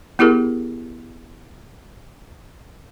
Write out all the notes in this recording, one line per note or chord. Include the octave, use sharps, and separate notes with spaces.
B3 E4 G4 G#4 A#4